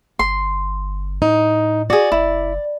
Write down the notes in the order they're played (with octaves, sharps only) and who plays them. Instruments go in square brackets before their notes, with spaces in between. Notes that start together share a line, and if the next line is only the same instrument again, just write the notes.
[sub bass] G1 [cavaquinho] C6
[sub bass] A2 [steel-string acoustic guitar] D#4
[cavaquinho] F#4 G#4 [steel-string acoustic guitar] D5
[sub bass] F#1 [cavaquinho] E4